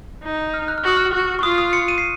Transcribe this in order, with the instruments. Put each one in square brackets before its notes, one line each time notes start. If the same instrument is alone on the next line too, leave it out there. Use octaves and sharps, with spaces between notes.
[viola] D#4
[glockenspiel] F6
F#6
F6
[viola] F#4 [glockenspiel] D#6
[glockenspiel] F6
[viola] F#4
[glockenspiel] C#6
[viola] F4 [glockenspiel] D#6
[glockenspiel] D#6
C#7
D#7
C7